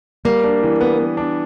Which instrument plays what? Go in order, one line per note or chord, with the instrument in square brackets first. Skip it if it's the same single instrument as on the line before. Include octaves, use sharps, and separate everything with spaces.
[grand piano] G3 [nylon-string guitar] A#3
[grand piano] D4
E3
B3
B3
D4